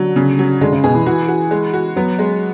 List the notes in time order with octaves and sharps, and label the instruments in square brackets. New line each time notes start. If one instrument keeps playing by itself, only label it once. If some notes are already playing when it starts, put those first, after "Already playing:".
Already playing: [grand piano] D3 [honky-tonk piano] F#3
[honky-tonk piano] C#3
F#3
[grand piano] D3 [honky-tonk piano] G#3
[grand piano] C#3
[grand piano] B2 [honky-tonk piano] G#4
[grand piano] E3
[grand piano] E3 [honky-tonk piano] F#4
[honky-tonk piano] F#4
G#3
F#4
[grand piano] F#3 [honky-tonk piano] B3
[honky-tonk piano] G#3